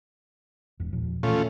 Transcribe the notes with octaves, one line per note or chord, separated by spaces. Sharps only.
E1 E2
E2 A#2 F3
A#2 E3 A3 C#4 F4